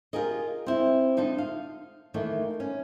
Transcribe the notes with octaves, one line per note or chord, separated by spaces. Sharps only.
F4 G4 G#4 A#4 D#5
C4 E4
D3 D#4 F4 D#5
F5
D#3 E3 A3 A#3 D#4
C#4